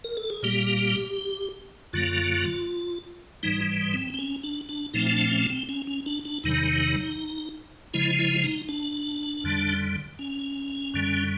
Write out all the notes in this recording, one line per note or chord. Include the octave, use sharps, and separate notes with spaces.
A#4
A4
G#4
A#2 G3 A#3 G4
F#2 D3 F#3 A#3 F4
G#2 E3 G3 D#4
C4
C4
C#4
D4
D4
A#2 F3 A3 C4 D#4
D4
C#4
C4
C#4
C#4
D4
D4
E2 C3 D#3 F#3 D#4
C#3 F3 G#3 E4
E4
D#4
D4
F2 D3 G3
C#4
F#2 D3 G3